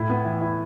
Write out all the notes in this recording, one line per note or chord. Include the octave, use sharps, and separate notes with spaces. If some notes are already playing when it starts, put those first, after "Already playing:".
Already playing: A2 E4
B3
E3
E4